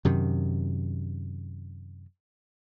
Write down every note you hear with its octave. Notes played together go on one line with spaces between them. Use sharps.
F#2 C3 D#3